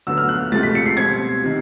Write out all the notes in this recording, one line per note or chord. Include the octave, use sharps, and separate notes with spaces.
D2 D3 F#3 B3 E6
F6
F#6
C#2 C3 F3 A3 A6
B6
C#7
C7
B2 G3 C4 G#6
C3 D#3